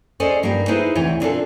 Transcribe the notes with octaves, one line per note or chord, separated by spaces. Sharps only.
C#4 G#4 A4 C5 D5 D#5
G2 A#3 D#4 G4 G5
D#4 E4 G#4 A4 B4 C5
D2 C3 E3 C4 C#5
A#2 B3 C4 D4 F4 A4